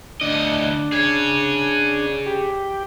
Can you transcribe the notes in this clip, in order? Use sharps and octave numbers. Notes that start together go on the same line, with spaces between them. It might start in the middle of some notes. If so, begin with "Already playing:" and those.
D2 D4 D#5
G#4 C#5
G4